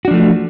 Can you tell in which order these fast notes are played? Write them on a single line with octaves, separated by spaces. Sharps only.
F#4 D4 F3 A3